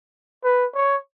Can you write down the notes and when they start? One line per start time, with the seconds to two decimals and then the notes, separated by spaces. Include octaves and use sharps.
0.44 B4
0.75 C#5